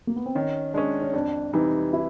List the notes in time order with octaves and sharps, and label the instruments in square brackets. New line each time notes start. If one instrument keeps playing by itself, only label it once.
[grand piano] A#3
B3
C4
[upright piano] D#3 [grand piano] C#4
[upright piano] G#3 C#4 [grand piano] D4
[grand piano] C#4
[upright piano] F2 [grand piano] D4
[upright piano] C3 E3 G3 [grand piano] D#4
[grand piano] E4